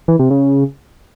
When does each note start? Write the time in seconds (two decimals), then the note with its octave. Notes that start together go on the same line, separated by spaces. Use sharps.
0.08 E3
0.19 C3
0.31 C#3